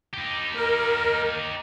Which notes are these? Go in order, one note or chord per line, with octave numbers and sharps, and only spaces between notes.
D#4 G4
A#4